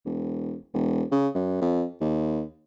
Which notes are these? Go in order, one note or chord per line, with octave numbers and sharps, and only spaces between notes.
E1
E1
C#3
F#2
F2
D#2